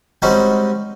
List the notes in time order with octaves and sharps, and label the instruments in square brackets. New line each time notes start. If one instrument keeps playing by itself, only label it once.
[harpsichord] G3 G#3 C4 C#4 D#4 F#4